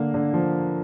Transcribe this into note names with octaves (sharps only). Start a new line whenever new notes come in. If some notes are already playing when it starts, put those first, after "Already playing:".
Already playing: D3 A#3
D3
F3